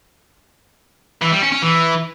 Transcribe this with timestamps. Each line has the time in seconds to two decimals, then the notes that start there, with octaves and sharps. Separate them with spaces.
1.22 E3
1.32 G3
1.42 C#4
1.52 C#4
1.62 E3